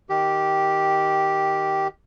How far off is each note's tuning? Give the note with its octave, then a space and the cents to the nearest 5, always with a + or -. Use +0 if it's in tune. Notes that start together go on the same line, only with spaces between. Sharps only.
D#3 +0 G4 -5